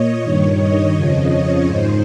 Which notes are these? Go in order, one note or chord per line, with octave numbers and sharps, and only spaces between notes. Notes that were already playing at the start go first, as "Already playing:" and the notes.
Already playing: A#2 C#5 D#5
G2 D#3 C#5
D#5
F2 C#3 F3
C#5
G#2 D#3 C5